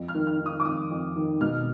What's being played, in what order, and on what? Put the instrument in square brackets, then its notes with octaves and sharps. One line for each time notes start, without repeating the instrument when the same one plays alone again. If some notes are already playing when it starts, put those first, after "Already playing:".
Already playing: [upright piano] F2
F6
D#3
F6
D#3
D#6
D6
F2 D#6
F2
D#3
B2 F6